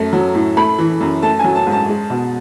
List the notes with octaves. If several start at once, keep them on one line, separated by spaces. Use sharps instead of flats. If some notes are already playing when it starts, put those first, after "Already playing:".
Already playing: F#2 A3
F#3
A2
A3 B5
E3
F#2
A3 A5
F#3 G#5
A5
G#2
A5
G#3
B2